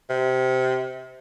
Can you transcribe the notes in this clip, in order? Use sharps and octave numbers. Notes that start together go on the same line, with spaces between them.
C3